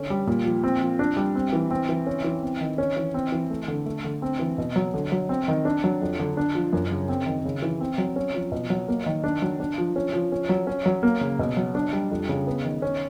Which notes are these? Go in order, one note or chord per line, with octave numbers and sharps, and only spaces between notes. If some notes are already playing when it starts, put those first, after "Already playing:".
Already playing: D3 C#4
G3
A#2
F3
C4
F3
D4
G3
C4
E3
C4
E3
C#4
E3
C4
D#3
C#4
E3
C4
E3
A3
D3
A3
D3
C4
E3
B2
F#3
D3
F#3
C4
D#3
D4
F#3
F2
D3
D4
F3
F#2
C#3
C4
D#3
C#3
E3
C4
F#3
C#4
F3
B2
F#3
A#3
D#3
D4
F#3
D4
F3
C#4
F3
C#4
F#3
C#4
F#3
A#3
C#3
B2
F#3
D4
G3
F2
C#3
B3
D#3
C#4